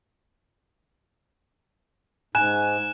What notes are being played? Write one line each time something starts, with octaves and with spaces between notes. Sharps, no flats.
G#2 G#5 F#6 E7